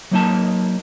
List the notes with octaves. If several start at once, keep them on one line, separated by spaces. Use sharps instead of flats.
F#3 A#3 D#4 A5